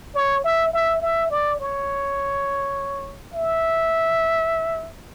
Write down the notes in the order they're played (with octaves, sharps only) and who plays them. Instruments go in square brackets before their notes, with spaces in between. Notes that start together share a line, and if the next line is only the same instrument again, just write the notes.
[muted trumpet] C#5
E5
E5
E5
D5
C#5
E5